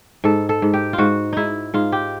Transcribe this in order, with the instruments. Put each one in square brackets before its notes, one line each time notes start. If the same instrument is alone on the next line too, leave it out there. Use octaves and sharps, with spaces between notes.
[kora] G#2 A4
A4
G#2
G4
F4
G#2 F#4
G#2 D#4 E4
G#2 F4
G4